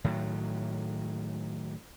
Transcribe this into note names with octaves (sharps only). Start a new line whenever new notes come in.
A2 D#3 F#3